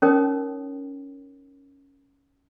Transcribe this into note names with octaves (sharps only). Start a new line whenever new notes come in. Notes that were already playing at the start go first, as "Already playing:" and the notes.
C#4 D#4 A#4 C#5 G5 D#6